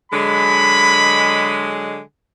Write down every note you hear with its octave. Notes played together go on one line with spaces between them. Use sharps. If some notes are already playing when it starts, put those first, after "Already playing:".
D3 F#3 G#3 B5